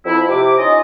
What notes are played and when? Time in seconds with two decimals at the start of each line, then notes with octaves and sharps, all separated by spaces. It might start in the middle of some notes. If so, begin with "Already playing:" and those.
0.06 F2 E4
0.29 C3 D6
0.58 C#4 D#4 F4 D#5